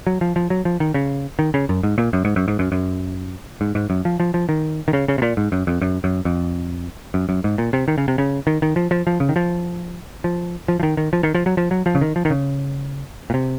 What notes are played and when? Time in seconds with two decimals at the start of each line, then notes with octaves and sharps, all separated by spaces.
0.07 F#3
0.21 F3
0.36 F3
0.50 F#3
0.65 F3
0.80 D#3
0.94 C#3
1.39 D#3
1.54 C#3
1.69 F#2
1.83 G#2
1.98 A#2
2.13 F#2
2.25 G#2
2.36 F#2
2.48 G#2
2.59 F#2
2.72 F#2
3.61 G#2
3.75 G#2
3.90 F#2
4.05 F3
4.20 F3
4.34 F3
4.49 D#3
4.88 D#3
4.93 C#3
5.08 C#3
5.18 C3
5.22 A#2
5.37 G#2
5.52 F#2
5.67 F2
5.81 F#2
6.04 F#2
6.25 F2
7.14 F#2
7.29 F#2
7.44 G#2
7.58 A#2
7.73 C3
7.88 D#3
7.98 C#3
8.08 C3
8.18 C#3
8.47 D#3
8.62 D#3
8.76 F3
8.91 F3
9.07 F3
9.20 C#3
9.29 D#3
9.36 F3
10.24 F3
10.68 F3
10.80 F3
10.83 D#3
10.97 D#3
11.13 F3
11.23 D#3
11.35 F3
11.46 F#3
11.57 F3
11.71 F#3
11.86 F3
11.95 C#3
12.01 D#3
12.16 F3
12.25 D#3
12.30 C#3
13.30 A#2
13.34 C3